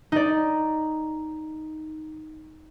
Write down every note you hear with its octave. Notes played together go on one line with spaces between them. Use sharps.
D#4 D5